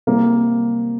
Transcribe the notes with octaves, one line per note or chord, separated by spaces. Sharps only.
C3 G3 A#3